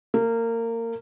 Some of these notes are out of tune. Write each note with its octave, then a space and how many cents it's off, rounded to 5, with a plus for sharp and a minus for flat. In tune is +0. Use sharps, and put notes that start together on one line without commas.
A#3 -25